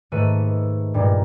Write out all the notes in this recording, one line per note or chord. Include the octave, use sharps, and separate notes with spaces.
G#2 D#3 A3 B4 C#7 D#7
G2 A#2 G#3 A#3